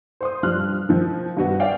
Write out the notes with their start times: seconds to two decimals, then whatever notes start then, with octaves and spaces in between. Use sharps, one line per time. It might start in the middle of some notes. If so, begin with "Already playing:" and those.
0.21 C5 C6 D#6
0.43 G2 F3 G3 F6 F#6
0.89 D#3 F3
1.37 G2 D#3 B3 F#4
1.60 C#5 D5 E5 F5 G5 G#5